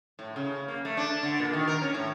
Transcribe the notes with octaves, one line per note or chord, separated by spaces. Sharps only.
A2
C#3
A#3
A3
D4
D3
A#2
D#3
A#4
C#4
A2